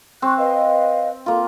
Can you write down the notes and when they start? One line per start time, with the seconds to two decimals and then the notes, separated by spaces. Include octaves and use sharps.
0.22 C4 C#6 F#6
0.38 B4 D#5 F5
1.26 A#3 F4 A4